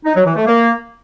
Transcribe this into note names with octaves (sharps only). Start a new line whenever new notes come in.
D#4
F#3
E3
A3
A#3